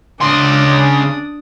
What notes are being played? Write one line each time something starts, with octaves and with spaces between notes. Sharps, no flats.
C#3 D4 C6 D#6